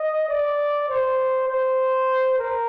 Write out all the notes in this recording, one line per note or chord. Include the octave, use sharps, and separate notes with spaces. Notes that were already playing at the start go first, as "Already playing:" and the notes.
Already playing: D#5
D5
C5
C5
A#4